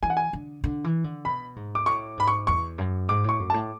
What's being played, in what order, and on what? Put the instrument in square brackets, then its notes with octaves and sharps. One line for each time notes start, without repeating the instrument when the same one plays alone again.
[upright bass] E3 [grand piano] G#5
[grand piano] F#5
G#5
[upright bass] D3
D3
E3
D3
[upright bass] B2 [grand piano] B5
[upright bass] G#2
[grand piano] D6
[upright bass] A2 [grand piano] C#6
[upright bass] G#2 [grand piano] B5
[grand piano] C#6
[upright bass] E2 [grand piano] C#6
[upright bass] F#2
[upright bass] G#2 [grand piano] D6
[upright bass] A2 [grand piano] C#6
[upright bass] F#2
[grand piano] A5
[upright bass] A2